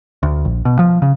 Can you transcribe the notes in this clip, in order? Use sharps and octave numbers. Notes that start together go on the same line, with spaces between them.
D2
A#1
B2
F3
C#3